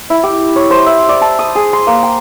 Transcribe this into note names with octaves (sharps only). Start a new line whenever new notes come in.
E4
G4
C#5
C5
E5
D5
A5
D#6
G#4
C6
A#3
G5